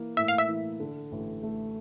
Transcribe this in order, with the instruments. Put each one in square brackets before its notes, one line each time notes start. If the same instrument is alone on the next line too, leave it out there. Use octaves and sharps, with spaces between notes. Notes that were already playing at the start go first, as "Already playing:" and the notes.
Already playing: [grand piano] E3 A#3
[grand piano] A2 [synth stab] E5
[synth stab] F5
E5
[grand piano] E3
D3
A1
A3